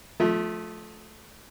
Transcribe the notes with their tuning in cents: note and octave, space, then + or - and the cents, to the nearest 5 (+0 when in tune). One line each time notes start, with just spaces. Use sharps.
F3 +15 A3 -20